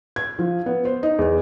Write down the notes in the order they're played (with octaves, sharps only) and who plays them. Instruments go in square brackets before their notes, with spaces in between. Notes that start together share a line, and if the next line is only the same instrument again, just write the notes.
[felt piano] G#6
F3
B3
C5
D#4
E2